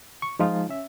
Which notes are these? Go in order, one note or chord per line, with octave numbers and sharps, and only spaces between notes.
C#6
F3 G#3 D#4 F4
C#4 E5